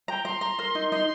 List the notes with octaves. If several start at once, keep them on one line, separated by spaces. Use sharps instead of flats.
G5 A#5
A#5 C6
A#5
A#4
D#4
D#4 C6